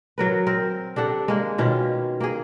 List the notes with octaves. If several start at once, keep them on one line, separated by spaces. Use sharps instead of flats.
F#3 A#4 B4
C4 A#4
D4 G4 A4 F#5
G#3 A#3
B2 D#3 C#4 F4
A#3 G#4